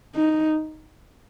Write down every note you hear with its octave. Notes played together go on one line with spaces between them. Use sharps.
D#4